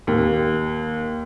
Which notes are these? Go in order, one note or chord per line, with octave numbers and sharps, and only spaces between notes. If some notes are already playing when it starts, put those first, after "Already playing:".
D#2